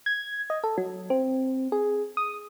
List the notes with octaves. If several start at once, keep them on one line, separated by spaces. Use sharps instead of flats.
G#6
D#5
A4
F#3
C4
G#4
D#6